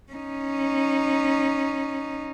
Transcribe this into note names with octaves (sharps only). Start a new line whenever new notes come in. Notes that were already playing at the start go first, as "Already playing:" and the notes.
C#4 D#4